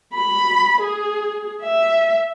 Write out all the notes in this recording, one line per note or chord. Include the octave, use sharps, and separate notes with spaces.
B5
G#4
E5